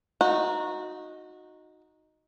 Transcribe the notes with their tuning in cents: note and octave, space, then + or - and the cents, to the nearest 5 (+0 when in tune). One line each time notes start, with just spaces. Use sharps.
D#4 +0 F#4 -20